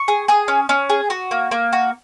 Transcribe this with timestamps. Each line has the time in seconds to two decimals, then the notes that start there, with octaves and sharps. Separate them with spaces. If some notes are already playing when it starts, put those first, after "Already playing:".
Already playing: C#6
0.08 G#4
0.28 G#4 D#6
0.48 C#4
0.69 C#4
0.90 G#4
1.10 F#4
1.31 A#3
1.51 A#3
1.73 F#4